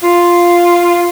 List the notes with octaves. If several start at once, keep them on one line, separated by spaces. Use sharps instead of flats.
F4